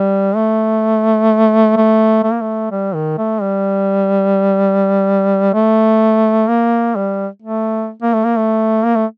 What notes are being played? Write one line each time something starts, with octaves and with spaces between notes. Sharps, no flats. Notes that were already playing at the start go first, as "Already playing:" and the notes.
Already playing: G3
A3
A3
A3
A#3
A3
G3
D#3
A3
G3
A3
A#3
G3
A3
A#3
A3
A#3
A3
A#3
A3